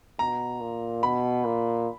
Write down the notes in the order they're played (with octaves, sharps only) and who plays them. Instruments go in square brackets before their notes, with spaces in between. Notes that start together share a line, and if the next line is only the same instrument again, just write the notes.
[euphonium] B2 [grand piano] A#5
[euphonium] A#2
[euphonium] B2 [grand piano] B5
[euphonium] A#2